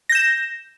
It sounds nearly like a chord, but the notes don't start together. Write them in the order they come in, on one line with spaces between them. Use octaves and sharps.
A#6 G6 E7